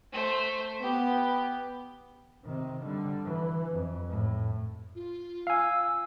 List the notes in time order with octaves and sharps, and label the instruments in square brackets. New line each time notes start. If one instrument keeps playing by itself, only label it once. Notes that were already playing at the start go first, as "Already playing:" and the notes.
[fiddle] A3 C5
[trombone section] B3 [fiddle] G4
[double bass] C3 D#3
D3 G3
E3
F2
A2
[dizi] F4
[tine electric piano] F5 G#5 [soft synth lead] E6